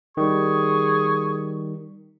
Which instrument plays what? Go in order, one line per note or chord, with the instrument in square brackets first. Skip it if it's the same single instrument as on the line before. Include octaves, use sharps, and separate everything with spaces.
[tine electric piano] D#3 G3 [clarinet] G#4 [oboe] C#6